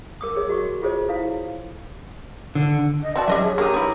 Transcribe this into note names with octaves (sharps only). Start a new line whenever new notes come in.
A#4 D6 D#6
G#4 C#5 D#5
F#4 D#5 C#6
F4 G#4 A4 C5 C#5 D#5
E4 A4 C#5 F5
D3
D#5
C4 F#4 D5 A5
F#3 C#4 G4 D#5 E5
G#4
A#3 D4 G4 A#5 D#6
B3 E4